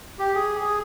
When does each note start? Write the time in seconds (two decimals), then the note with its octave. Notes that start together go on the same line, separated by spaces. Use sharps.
0.19 G4
0.35 G#4
0.61 G#4